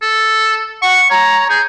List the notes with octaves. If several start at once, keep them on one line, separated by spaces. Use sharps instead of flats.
A4
F#5 C#6
C#5 A#5
G#4 G6